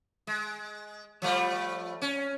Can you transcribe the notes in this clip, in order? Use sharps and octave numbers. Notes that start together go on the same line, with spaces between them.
G#3
F3 G3 A3
C#4